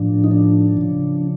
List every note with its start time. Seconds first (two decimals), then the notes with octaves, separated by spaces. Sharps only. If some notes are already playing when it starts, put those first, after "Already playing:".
Already playing: A2 F3 D4
0.24 D#4
0.31 D4
0.77 C#3 F3